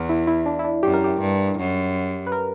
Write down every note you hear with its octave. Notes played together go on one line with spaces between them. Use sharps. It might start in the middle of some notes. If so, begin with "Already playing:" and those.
Already playing: E2
E4
E4
D4
E4
D4
F#2 G4
A#4
G4
G2
F#2
B4
A#4